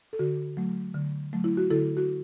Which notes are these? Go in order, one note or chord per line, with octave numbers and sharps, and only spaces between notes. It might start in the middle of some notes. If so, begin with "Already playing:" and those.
A4
D3 F#4
F#3 A3
D3
F#3 A3
E4
F#4
D3 E4 A4
F#4